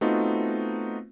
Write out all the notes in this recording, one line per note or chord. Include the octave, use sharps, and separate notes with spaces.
A3 B3 C4 D#4 F4 F#4